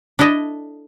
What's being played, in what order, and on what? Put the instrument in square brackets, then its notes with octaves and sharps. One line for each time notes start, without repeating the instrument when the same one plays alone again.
[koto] D4 E4 A4 D#5